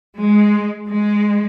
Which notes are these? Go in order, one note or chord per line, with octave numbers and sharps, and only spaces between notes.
G#3
G#3